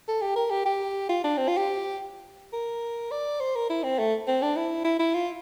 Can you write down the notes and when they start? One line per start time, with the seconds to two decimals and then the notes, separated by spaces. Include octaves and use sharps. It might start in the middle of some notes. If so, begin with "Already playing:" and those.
0.08 A4
0.22 G4
0.36 A#4
0.50 G4
0.65 G4
1.09 F4
1.24 D4
1.37 C4
1.48 F4
1.57 G4
2.53 A#4
3.11 D5
3.40 C5
3.55 A#4
3.70 E4
3.83 C4
3.99 A3
4.27 C4
4.42 D4
4.56 E4
4.84 E4
4.99 E4
5.14 F4